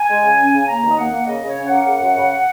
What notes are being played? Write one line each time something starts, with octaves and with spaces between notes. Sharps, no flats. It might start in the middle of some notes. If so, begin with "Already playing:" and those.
Already playing: G#5
G#3
C#3
C#4
C#3
A#3 A#5
D#2
D#5
A#3 F#5
A#3
C#3 D#5
C#3
C#5
C#4
F#5
A#3
C#3
F#2
C#3